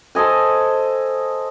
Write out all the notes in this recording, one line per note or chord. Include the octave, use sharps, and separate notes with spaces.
A4 C5 D#5 G#5